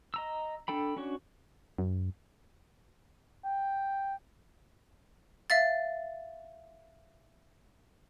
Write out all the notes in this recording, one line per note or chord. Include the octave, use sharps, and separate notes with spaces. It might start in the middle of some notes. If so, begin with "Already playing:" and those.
D#5 A#5 E6
D4 A4 G5 B5
C#4 D4 F#4 C#5
F#2
G5
E5 F5 A6